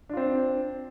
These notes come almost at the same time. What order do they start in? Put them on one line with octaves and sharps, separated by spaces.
D4 F4 C4